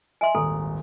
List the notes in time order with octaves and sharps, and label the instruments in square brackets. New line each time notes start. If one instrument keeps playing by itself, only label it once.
[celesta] D#5 E5 [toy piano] G#5 C6
[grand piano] D#1 G#1 [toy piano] A4 [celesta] A#5